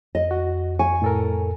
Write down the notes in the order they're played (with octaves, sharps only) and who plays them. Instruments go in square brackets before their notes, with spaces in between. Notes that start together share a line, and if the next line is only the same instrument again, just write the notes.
[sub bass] F2 [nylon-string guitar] D#5
[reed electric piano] F#4
[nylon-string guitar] G#5 [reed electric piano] C#6
[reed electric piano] A2 A4 A#4